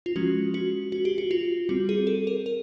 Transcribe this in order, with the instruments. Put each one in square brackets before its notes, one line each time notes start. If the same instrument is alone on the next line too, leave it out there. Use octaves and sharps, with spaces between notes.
[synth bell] F4
F3 G#3 C#4 F#4
F#4
F#4
G4
F#4
F4
G3 C4 F#4
G#4
A4
A#4
A#4